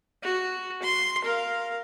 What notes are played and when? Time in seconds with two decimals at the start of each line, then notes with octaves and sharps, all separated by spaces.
0.23 F#4
0.83 C6
1.24 A#4 F5